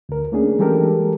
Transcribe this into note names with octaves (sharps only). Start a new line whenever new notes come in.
D2 A#4
A3 A#3 C#4 D4 G#4
E3 G3 G#3 G4 A4 A#4